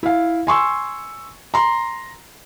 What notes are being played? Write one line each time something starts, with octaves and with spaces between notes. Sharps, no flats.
E4 F5
G#5 C6 C#6 E6
A#5 C6